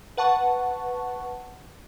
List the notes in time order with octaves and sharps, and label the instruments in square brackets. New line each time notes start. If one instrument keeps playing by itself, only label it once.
[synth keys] B4 F#5 A5 C#6